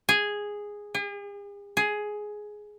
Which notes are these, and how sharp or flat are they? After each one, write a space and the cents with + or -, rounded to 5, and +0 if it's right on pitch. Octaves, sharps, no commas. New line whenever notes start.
G#4 -5
G#4 -45
G#4 +10